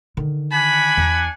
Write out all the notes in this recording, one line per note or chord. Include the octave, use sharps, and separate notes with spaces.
D3 D#3
D4 F#5 G#5 B5
E2